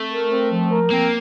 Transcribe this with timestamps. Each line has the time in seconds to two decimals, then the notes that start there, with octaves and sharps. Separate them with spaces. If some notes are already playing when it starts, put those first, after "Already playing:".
Already playing: A3 C4
0.12 A#4
0.31 C4
0.51 F3
0.71 A#4
0.91 A#3 C4